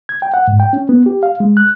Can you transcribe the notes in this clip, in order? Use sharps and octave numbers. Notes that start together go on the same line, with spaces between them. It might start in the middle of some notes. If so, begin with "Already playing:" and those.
G#6
G5
F#5
G#2
G5
C#4
B3
G4
F5
G#3
F#6